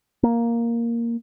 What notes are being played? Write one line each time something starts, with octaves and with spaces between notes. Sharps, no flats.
A#3